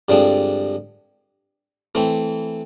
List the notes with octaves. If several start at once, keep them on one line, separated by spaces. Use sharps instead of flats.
G2 D3 F3 G#3 C4
E3 A3 C4